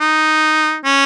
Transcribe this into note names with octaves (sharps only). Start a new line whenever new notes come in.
D#4
C#4